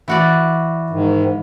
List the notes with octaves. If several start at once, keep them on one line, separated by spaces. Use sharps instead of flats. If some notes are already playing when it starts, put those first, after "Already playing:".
E3 F#4 D5
G#2 D#3